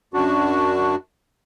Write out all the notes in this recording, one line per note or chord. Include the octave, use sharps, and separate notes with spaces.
F#2 D4 F#4